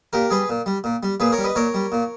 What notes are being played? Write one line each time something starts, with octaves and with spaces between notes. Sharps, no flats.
A#2 G4 A#4
G3 G#4 B4
A#2
G3
A#2
G3
A#2 G#4 B4
A#4 C#5
G3
B4 D#5
A#2 A#4 C#5
G3
A#2